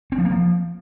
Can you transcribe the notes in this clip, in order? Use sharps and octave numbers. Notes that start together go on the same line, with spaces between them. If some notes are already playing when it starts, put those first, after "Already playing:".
C4
F3
A#3
F3